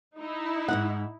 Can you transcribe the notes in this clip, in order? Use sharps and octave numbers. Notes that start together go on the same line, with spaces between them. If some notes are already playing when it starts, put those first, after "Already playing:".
D#4 E4
G#2 D#3 F#5